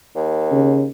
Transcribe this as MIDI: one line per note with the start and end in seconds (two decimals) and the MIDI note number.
0.16 0.90 39
0.51 0.87 49